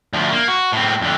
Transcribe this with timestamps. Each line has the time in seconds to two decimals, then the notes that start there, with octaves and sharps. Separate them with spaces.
0.13 D2 F3
0.31 A#3
0.48 F#4
0.72 A2 C4
1.01 F2 D3